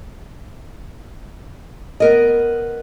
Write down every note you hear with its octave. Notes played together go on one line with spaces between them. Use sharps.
B3 A#4 D#5